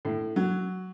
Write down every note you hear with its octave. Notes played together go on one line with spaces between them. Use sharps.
A2
F#3